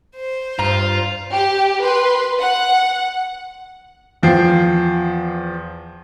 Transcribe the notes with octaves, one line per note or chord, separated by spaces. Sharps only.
C5
G2 F4 A#5
G4
B4 C6
F#5
E2 F3 G5 C7